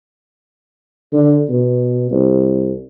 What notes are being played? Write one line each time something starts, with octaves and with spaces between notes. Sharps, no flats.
D3
B2
C2